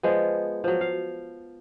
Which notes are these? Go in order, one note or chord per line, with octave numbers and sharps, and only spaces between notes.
F3 G#3 B3
F3 F#3
F5